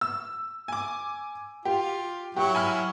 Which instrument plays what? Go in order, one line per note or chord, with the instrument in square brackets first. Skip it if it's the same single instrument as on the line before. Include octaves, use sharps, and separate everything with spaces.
[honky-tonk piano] E6
G#5 D6
[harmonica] F4 [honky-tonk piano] G4
[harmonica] F#3 E4 F#4 [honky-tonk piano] G4
[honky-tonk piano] G#5 B5 F6